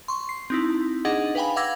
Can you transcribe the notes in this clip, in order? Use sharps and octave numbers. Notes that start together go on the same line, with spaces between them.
C6 C#6
C7
C4 D#4 E4
D4 D#4 G#4 D#5 F#5
B4 F5 G5 G#5 B5
F5 F#5 D6 E6 G#6 A#6